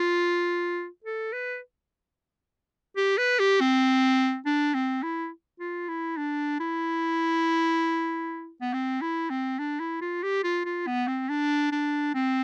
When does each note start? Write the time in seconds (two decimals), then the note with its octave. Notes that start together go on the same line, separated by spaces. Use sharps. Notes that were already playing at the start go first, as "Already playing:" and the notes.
Already playing: F4
1.04 A4
1.33 B4
2.97 G4
3.18 B4
3.39 G4
3.61 C4
4.46 D4
4.74 C4
5.03 E4
5.60 F4
5.89 E4
6.17 D4
6.60 E4
8.61 B3
8.73 C4
9.02 E4
9.30 C4
9.59 D4
9.80 E4
10.01 F4
10.23 G4
10.44 F4
10.65 F4
10.87 B3
11.07 C4
11.29 D4
11.72 D4
12.15 C4